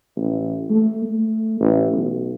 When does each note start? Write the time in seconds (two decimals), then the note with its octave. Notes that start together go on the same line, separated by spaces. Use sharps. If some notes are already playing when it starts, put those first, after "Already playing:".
0.17 A1
0.70 A3
1.05 A3
1.60 A1
1.93 B1